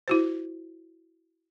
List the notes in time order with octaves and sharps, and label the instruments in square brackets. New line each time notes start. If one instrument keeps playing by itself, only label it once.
[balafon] E4 F#4 C5